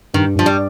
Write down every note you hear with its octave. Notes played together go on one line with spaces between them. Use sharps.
G2 D#3
G2 F3
G3